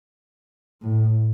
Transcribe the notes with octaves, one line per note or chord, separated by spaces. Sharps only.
A2